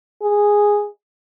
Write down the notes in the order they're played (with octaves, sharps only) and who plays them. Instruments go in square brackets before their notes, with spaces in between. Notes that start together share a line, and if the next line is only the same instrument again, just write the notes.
[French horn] G#4